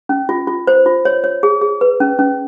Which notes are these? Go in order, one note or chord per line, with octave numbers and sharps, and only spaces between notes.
C#4
F4
F4
C5
F4
C#5
C#5
G#4
G#4
B4
C#4
C#4